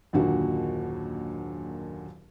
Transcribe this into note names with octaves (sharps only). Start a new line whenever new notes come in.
F#1 D#2 A#2 D3 F#4